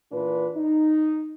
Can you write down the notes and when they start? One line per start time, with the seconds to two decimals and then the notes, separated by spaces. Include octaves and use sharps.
0.12 A#2 E3 D4 F4 B4
0.56 D#4